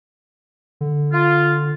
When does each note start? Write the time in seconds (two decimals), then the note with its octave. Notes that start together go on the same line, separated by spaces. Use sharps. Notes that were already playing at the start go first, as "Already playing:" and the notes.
0.81 D3
1.12 F4